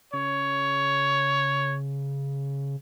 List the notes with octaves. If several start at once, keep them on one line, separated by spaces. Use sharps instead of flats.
C#3 C#5